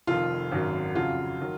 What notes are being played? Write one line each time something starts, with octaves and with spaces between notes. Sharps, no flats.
F1 F2 D#3 F4
G#1 F#2 D#3 F#3
F2 C#3 F#3 F4
D#3 F#3